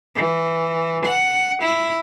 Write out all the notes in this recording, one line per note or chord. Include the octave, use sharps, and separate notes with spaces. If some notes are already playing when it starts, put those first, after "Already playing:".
E3
F#5
E4